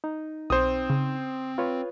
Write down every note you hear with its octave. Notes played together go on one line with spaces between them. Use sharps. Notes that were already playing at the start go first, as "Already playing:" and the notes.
D#4
B1 C4 C5 D#6
C#3
F4 B4 C#5